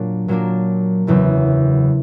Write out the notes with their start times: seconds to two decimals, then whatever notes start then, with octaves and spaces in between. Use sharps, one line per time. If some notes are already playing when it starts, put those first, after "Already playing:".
Already playing: A#2 F#3 A#3 D4
0.28 A#2 F#3 A#3 D4
1.07 F#1 E2 C#3 F#3